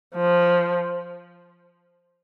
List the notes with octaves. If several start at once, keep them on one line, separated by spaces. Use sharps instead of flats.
F3